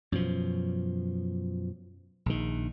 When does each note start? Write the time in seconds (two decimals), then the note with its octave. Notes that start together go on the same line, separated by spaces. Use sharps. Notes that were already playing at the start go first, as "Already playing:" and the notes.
0.12 F#2 B2 F3
2.26 A#1 D#3